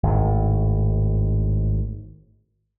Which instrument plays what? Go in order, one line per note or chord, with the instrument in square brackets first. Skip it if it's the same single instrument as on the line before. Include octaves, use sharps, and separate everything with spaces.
[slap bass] G#1 A2